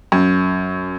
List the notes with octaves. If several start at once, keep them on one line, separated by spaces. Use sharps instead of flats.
F#2